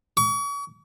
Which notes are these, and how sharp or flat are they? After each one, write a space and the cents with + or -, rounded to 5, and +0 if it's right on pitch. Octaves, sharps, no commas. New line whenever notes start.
C#6 +40